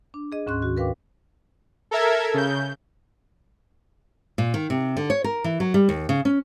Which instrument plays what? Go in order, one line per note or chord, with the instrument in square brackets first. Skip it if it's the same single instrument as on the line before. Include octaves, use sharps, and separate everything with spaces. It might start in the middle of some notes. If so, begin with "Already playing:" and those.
[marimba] D4
G#4 D#5
D2 G#2 C#4 C6 F#6
D#3 F#4
A#4 B4 F5 G5 D6
[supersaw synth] A4 A#4 E5 G#6
C#3 G6
[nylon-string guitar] A#2
D#3
C3
D3
C#5
A#4
E3
F#3
G3
D#2
C#3
C#4